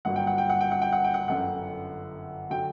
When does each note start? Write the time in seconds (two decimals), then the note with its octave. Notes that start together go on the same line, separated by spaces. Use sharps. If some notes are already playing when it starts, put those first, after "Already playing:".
0.05 G1 G2 F#3 A#3 F#5
0.16 G5
0.27 F#5
0.38 G5
0.50 F#5
0.61 G5
0.71 F#5
0.82 G5
0.93 F#5
1.04 G5
1.14 F#5
1.28 G1 F#2 D3 F#5
2.50 D3 F#3 G5